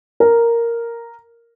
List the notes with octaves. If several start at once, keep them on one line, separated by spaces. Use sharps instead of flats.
A#4